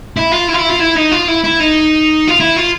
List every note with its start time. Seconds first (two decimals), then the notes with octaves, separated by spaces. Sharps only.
0.17 E4
0.32 F4
0.48 E4
0.54 F4
0.59 E4
0.70 F4
0.80 E4
0.96 D#4
1.12 F4
1.28 E4
1.44 E4
1.60 D#4
2.28 F4
2.40 E4
2.56 F4